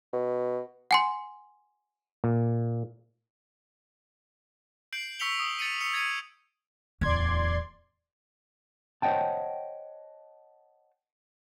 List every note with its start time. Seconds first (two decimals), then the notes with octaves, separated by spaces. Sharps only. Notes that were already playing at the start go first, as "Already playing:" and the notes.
0.13 B2
0.91 F#5 G#5 C6
2.24 A#2
4.93 G6 C7 D7 F#7
5.19 C#6 E6 B6 C#7 F7 G7
5.39 D#6
5.59 A6 C#7 D#7
5.81 E6 C#7 F7
5.94 G#6 A6 C#7 D#7
7.01 D1 E2 D5 C6 G#6
9.02 C5 C#5 D#5 F#5 G5 A5